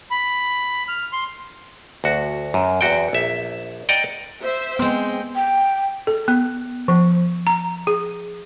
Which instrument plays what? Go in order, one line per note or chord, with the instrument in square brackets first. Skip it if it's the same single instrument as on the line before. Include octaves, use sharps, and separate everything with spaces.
[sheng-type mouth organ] B5
F6
C6
[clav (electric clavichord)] D2 F#4
F#2
E2 F#4 G5
A#1 E5
D5 D#5 F#5 G5 A#5
[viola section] C5 E5
[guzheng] G#3 C4 [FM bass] B3 [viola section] G5
[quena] G5
[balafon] A4
B3
F3
A#5
G#4